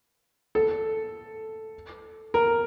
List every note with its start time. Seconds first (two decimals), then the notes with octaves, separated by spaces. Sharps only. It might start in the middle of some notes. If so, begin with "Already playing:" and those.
0.55 A4
2.34 A#4